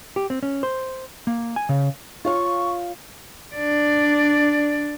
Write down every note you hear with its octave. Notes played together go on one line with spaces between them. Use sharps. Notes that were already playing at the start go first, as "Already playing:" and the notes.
G4
C4
C#4
C5
A#3
G#5
C#3
F4 C#5 F5 C#6
D4 D5